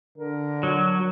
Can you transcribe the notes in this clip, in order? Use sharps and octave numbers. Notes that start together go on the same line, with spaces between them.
D3 A#4
F#3